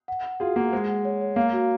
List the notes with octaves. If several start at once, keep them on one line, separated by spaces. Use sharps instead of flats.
F#5
F#5
F4 F#4 G#4
A#3 F#5
G#3 C5
F#5
C#5
C#5
A#3 F5
F#4